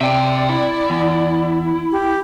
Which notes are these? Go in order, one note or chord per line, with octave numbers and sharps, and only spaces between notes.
C3 D5 E5 G5
E4
E2
G4